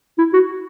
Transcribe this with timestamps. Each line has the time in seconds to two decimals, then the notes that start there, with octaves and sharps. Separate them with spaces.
0.18 E4
0.33 F#4